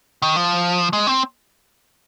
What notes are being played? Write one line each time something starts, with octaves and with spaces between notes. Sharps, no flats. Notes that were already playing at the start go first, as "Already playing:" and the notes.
D#3
F3
G#3
C4